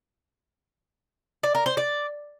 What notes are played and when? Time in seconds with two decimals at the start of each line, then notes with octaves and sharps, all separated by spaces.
1.43 D5
1.55 A#4
1.66 C5
1.77 D5